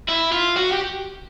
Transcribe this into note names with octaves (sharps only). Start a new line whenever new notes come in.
E4
F4
F#4
G4